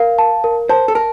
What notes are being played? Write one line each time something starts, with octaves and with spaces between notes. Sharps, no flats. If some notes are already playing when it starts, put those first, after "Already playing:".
Already playing: A#4 F5
A5
A#4
C5 A5
A4
A#4 A5